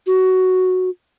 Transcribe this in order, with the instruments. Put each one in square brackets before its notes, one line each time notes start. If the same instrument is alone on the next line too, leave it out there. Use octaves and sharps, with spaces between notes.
[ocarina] F#4